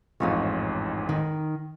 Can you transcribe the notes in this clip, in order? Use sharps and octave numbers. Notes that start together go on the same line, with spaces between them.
A1 F2 G#2 D#4 F4 C#5
D#3